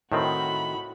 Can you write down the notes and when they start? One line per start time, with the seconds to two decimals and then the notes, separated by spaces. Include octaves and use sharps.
0.12 A2 D#3 C4 F#4 B5